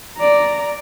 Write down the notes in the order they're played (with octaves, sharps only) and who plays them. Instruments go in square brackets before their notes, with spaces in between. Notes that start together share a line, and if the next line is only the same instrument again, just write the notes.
[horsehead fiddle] D5 A#5